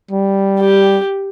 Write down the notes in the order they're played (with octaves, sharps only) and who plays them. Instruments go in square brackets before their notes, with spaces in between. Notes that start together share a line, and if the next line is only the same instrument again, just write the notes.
[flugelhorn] G3
[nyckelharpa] G4